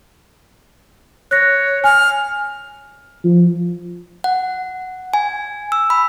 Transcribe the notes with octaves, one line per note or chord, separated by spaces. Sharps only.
C#5 F#6 A#6
G#5 F6
F3
F#5
G#5
E6
B5